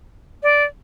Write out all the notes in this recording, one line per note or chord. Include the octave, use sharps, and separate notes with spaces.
D5